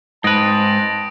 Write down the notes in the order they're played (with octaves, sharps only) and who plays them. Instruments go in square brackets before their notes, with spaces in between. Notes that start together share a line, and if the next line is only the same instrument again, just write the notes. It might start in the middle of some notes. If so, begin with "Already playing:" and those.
[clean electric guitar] G#2 B4 [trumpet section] C4 A5 [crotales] D#6 A#6 D7